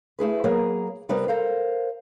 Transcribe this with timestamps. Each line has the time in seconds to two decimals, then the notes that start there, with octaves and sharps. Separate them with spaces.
0.19 A3 E4 G#4 B4
0.44 F#3 A#3 B3 G#4 A#4
1.09 C3 G3 B3 D4 A#4 B4
1.28 A4 A#4 C5 F5